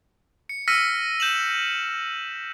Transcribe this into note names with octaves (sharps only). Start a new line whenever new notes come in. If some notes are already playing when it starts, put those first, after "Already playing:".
C#7
E6 F6 A#6 B6 C#7 D#7
G6 E7 F#7